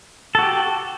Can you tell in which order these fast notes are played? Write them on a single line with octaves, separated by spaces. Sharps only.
A4 F#4 G4